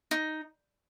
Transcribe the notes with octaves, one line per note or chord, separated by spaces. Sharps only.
D#4